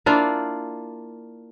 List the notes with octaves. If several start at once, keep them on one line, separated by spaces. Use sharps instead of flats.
A#3 D4 E4 F4